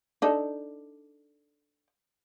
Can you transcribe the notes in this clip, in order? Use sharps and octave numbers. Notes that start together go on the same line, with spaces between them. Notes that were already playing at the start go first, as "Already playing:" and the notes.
D4 D#4 A4